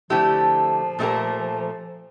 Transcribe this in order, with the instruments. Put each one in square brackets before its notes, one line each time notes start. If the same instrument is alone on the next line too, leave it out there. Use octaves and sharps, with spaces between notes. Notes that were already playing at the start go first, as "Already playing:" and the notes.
[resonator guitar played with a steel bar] D3 A3 E4 G4 [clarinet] F3
[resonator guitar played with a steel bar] A#2 A3 E4 G4 A#4